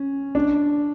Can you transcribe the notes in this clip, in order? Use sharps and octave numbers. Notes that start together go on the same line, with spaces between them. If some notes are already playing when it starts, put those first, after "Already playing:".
Already playing: C#4
D4